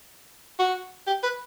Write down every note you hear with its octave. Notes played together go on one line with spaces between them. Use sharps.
F#4
G4
B4